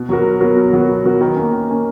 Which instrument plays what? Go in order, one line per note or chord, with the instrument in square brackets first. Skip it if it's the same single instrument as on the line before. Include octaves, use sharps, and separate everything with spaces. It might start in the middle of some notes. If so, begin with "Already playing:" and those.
Already playing: [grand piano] B2
F#3 B3 F#4 A#4
B2
F#3 B3 F#4 A#4
B2
F#3 B3 F#4 A#4
B2
F#3 B3 F#4 A#4
D#3
A#3 C#4
D#3
A#3 C#4